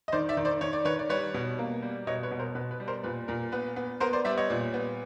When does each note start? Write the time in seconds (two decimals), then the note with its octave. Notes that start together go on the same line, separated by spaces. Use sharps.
0.08 D#5
0.12 D#3 C5 D5
0.29 D5 E5
0.37 D#3
0.45 C5 D5
0.61 D#3 C#5
0.73 D5
0.85 D#3 B4 C#5
0.99 D5
1.09 G3 B4 C#5
1.34 B2
1.59 A#3
1.83 G3
2.07 B2 C#5 D#5
2.23 B4 C#5
2.31 B2
2.39 A#4 C5
2.55 B2 B4
2.71 B4
2.80 G3
2.87 A#4 C5
3.04 A#2 B4
3.28 A#2 A#4
3.52 B3 B4
3.76 B3
4.00 B3 A#4 C5
4.13 C5 D5
4.25 G3 D5 E5
4.37 C#5 D#5
4.50 A#2
4.74 B3